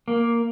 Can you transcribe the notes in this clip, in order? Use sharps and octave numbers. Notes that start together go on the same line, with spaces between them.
A#3